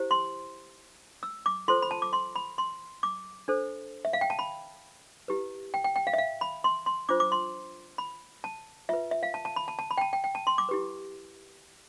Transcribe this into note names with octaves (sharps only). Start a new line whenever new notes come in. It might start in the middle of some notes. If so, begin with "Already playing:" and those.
Already playing: E4 G4 C5
C6
E6
D6
F4 A4 C5 C6
B5
A5
D6
C6
B5
C6
D6
D4 A4 C5
E5
F5
G5
A5
B5
E4 G4 B4
G5
G5
G5
F5
E5
F5
B5
C6
C6
D4 F4 C5 D6
D6
C6
B5
A5
F4 B4 E5
E5
F5
A5
A5
B5
A5
A5
B5
G5
A5
G5
G5
A5
C6
D6
E4 G4 B4